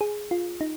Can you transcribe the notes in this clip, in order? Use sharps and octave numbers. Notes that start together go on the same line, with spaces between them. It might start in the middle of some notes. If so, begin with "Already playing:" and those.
G#4
F4
D#4